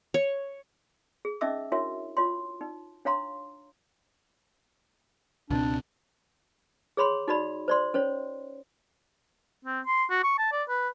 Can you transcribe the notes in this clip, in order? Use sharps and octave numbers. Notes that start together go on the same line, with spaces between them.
C#5
G#4
C#4 D#4 D#5 E5 D6 E6
D4 E4 F#4 A#4 C#5 E5
F4 C#5 C6
D#4
D4 C#5 F5 A#5 C6
C#2 B2 C4 D4
G#4 C#5 B5 C6
D#4 F#4 D5 B5
C5 D5 C6
C#4 C5 C#5
C4
C6
F#4
C#6
A5
D5
B4